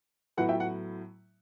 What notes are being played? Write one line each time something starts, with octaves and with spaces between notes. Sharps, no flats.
A2 F#3 B3 E4 F#5
E5 G5
F#5